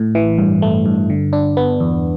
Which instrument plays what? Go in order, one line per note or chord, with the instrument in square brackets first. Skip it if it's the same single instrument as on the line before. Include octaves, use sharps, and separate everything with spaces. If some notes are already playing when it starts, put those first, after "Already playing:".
Already playing: [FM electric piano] A2
E3
G2
A3
G2
D3
D4
B3
E2